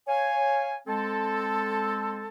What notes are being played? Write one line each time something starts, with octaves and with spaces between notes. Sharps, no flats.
C#5 F5 G#5
G#3 C4 A4